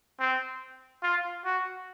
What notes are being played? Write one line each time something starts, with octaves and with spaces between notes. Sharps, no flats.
C4
F4
F#4